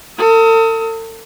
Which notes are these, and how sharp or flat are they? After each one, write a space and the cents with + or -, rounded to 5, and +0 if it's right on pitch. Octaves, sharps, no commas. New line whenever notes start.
A4 +45 D#6 +35